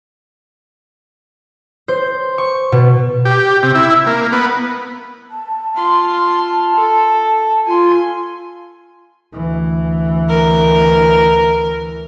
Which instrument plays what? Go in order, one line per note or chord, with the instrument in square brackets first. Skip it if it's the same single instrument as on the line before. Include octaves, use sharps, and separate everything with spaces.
[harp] C5
C#6
B2
[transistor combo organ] G4
C3
E4
A#3
B3
[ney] A5
[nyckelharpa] F4 C6
A4
[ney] F4 [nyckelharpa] G#5 C6
[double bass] D2 E3
[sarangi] A#4